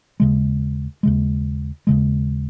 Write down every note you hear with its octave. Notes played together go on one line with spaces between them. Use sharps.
D#2 C#3 G#3
D#2 C#3 G#3
D#2 C#3 G#3